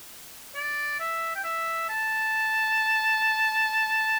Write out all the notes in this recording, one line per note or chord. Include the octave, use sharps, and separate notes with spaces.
D5
E5
G5
E5
A5